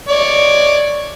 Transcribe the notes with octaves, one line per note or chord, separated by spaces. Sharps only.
C#5 D5